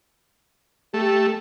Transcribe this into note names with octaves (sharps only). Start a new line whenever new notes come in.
A3 G4